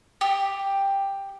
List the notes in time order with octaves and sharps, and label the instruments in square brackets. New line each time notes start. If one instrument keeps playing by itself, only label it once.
[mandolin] G4